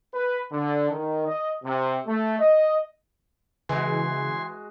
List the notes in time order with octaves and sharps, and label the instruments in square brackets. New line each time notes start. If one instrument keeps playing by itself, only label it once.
[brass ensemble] B4
D3
D#3
D#5
C3
A3
D#5
[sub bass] C#3 [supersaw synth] E3 [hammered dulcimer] G#3 F#4 [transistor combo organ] G#5 C6